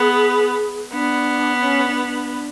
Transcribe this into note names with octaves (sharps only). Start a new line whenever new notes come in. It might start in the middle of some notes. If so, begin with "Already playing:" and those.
Already playing: B3 G#4
B3 D4
C#4
D4
D4